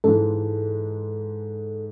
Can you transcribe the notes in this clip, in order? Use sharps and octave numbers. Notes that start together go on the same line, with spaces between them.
G#2 E3 G#3 A4